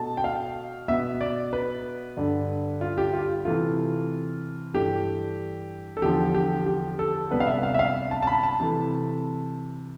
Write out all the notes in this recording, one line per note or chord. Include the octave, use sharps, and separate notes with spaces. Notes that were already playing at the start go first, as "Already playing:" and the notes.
Already playing: B2 A3 A5
G5
F5
B2 B3 E5
D5
B4
G2 D3 G3
F4
G4
F4
C3 E3 A3 F4
G2 E3 A3 G4
A4
E2 D3 F3 G4
G4
G4
A4
C3 G3 B3 B4
F5
E5
F5
E5
F5
A5
A5
B5
A5
C3 E3 A3